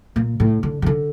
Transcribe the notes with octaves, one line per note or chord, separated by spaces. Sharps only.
A#2
A2
D3
C#3
D3